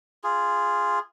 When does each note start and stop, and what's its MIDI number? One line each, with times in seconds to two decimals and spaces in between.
0.24 0.99 65
0.24 0.99 68